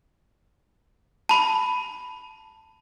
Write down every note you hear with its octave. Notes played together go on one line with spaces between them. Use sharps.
A5 B5